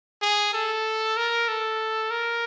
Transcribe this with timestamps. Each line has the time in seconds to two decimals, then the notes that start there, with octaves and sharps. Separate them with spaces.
0.22 G#4
0.53 A4
1.17 A#4
1.48 A4
2.11 A#4